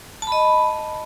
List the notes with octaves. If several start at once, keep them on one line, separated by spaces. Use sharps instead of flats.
D#5 A5 B5